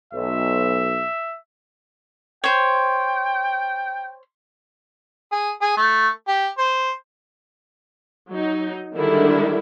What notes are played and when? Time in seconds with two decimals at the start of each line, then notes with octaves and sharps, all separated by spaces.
0.13 B1 E5
2.44 C5 C#5 G5
5.32 G#4
5.62 G#4
5.77 A3
6.28 G4
6.58 C5
8.32 F#3 D#4
8.94 D3 D#3 G3 G#3 D4 E4